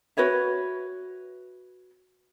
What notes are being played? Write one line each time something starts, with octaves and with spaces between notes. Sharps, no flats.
F#4 B4 C#5 E5